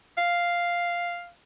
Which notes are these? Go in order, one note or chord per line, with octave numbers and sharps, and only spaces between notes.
F5